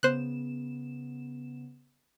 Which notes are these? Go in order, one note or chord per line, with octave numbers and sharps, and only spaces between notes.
C#3 B3 C5 F#6 E7